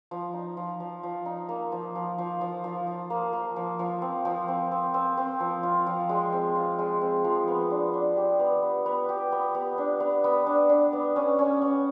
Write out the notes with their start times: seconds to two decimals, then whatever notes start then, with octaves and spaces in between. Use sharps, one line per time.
0.11 F3
0.34 D#4
0.57 F3
0.80 F3
1.03 F3
1.26 D#4
1.49 A#3
1.72 F3
1.95 F3
2.18 F3
2.41 F3
2.64 F3
2.87 F3
3.10 A#3
3.33 A#3
3.56 F3
3.79 F3
4.02 C4
4.25 F3
4.48 C4
4.72 C4
4.94 C4
5.17 C4
5.40 F3
5.63 F4
5.87 F3
6.09 G#3
6.32 C4
6.56 F4
6.79 G#3
7.01 C4
7.24 F3
7.48 B3
7.71 D4
7.94 D4
8.17 G4
8.40 B3
8.63 B3
8.86 B3
9.09 G4
9.32 B3
9.55 B3
9.78 D4
10.00 B3
10.24 B3
10.47 D4
10.69 D4
10.93 B3
11.16 C#4
11.39 C#4
11.62 C#4